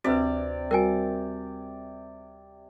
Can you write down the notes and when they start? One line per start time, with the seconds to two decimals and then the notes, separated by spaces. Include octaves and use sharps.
0.04 D2 C3 C4 F#4 B4 D5
0.71 G3 F#4 A#4 G5 G#5